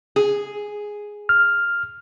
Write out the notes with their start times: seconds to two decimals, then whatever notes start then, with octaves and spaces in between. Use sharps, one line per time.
0.16 G#4
1.29 F6